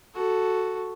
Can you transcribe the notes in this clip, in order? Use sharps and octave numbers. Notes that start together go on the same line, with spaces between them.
F#4 A4